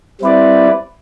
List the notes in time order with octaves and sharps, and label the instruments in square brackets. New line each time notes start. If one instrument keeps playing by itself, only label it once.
[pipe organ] G3 C4 E4 B4 D5